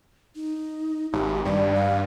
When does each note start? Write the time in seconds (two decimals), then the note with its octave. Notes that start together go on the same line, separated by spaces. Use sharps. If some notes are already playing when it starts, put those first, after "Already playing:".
0.36 D#4
1.13 G#1 G4
1.45 G2 D5
1.75 F5